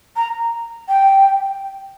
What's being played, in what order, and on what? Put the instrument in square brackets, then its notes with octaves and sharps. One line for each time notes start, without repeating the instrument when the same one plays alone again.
[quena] A#5
G5